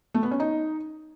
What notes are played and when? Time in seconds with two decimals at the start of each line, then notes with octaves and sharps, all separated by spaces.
0.14 A3
0.23 B3
0.31 C#4
0.40 D#4